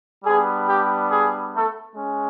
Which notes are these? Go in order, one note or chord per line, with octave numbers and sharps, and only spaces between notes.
G3 B3 D4 G#4
G4
G#4
A3 A4
G#3 C#4